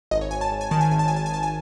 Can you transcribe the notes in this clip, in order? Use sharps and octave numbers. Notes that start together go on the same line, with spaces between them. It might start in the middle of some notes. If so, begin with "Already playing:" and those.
G#1 D#5
C#5
G#1 G#5
A5
G#1
G#5
D#3 A5
G#5
G#1 G#5
A5
G#1 G#5
A5
G#5
G#1 A5
G#5